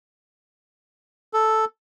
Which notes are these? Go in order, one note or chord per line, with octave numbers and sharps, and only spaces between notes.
A4